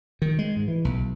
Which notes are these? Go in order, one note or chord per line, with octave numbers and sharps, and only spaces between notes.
D#3
G#3
G#2
E3
B1